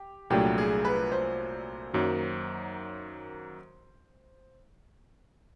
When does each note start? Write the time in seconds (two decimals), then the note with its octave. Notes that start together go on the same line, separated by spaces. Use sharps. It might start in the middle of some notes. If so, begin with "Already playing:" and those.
Already playing: G4
0.30 C2 A#2 F#3 A3 D4 G4
0.58 G#4
0.85 B4
1.12 C5
1.94 F#2 D#3 F#3 A#3